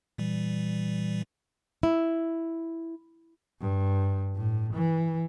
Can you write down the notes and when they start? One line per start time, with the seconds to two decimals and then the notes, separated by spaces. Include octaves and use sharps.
0.18 A#2 E3 G3
1.83 E4
3.61 G2
4.36 A2
4.74 E3